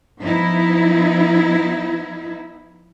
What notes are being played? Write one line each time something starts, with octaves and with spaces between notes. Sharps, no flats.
F3 B3 D#4 E4